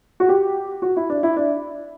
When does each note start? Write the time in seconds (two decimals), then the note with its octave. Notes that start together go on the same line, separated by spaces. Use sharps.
0.20 F#4
0.29 G4
0.82 F#4
0.97 E4
1.10 D4
1.23 E4
1.36 D4